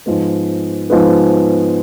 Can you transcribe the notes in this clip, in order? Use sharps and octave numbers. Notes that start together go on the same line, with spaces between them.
G#2 F3 G#3 B3
G#2 F3 G#3 B3